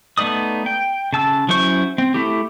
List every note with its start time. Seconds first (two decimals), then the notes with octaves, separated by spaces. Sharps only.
0.18 A3 B3 D#4 D5 D#6
0.66 G5
1.13 C#3 A5 E6
1.49 F#3 C#4 E4 C5 C#6
1.98 C4
2.14 A3 E4 G4